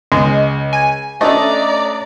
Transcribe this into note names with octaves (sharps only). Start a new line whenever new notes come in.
C#2 G#3
G#5
A3 C#4 D4 D5 D#5 A#5